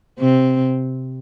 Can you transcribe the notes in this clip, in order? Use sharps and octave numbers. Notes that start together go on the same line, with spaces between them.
C3 C4